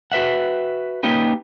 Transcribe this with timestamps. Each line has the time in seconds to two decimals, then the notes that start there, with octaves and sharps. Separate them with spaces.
0.12 F#4 B4 E5 F#5
1.03 A#3 C#4 D#4 G4 B4